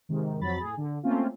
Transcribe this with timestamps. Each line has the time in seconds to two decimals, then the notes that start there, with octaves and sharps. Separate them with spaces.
0.09 G#2 C3 D#3
0.41 F2 F#3 B5 A6
0.60 A2 G#4
0.77 D3
1.03 A3 A#3 C4 C#4 F4